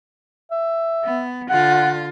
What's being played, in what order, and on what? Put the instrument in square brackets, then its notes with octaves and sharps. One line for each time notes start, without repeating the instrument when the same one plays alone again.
[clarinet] E5
[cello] B3
[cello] D3 F4 [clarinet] F#5